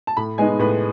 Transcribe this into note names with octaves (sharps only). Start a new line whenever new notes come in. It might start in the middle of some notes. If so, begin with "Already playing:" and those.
A5
A2 B5
G#3 B3 D#4 G#5
A2 B4